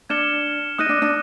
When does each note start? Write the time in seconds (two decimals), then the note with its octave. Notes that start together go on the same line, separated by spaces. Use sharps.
0.09 D4 F6 G#6 C#7 E7 G7
0.78 D#4 D#6 F#6 A#6 D#7
0.89 D4
1.02 D4